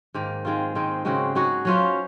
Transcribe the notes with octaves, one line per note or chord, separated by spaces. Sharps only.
G#2 D#3 A#3
D#3 G#3 C4 F4
D#3 G#3 C4 D#4
C#3 G#3 C4 F#4
G#3 D#4 F#4 C#5
F#3 C#4 F4 C5